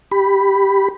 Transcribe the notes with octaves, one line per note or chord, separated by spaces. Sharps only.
G4 B5